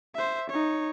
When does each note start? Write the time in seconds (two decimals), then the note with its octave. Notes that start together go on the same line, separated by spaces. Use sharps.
0.15 C5 E5
0.50 D#4 C#5